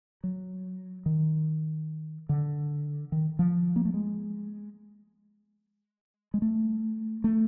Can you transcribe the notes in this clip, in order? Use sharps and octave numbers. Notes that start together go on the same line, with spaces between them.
F#3
D#3
D3
D#3
F3
A#3
A3
G#3
G#3
A3
A3